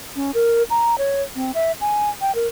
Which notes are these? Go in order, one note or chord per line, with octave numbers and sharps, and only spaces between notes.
C#4
A#4
A#5
C#5
C4
E5
G#5
G5
A#4